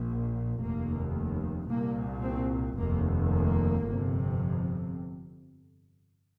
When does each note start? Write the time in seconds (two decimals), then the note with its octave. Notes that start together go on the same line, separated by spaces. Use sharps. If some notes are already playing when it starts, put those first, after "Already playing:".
Already playing: A#1 A#2
0.61 F1 D#2 A#3
1.69 C2 A#2 A#3
2.23 C4
2.77 F1 D#2 A#3
3.31 A#3
3.85 G1 F2 C3